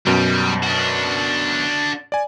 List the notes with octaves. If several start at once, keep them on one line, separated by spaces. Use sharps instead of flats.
F#2 B2 G3
D4 F#4
D5 G#5